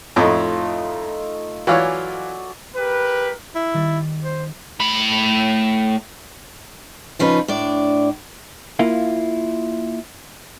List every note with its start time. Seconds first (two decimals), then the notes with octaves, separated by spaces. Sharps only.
0.16 F2 A2 A3 D#4 F4
1.67 E3 F#3 F4 C#5 D5 G#5
2.76 G4 A#4 B4
3.55 E4
3.74 D#3 G3 A6
4.24 C5
4.80 A2 B5
7.19 C#3 F3 C#4 D#4 B4
7.48 A2 D4 D5
8.79 A#3 E4 F4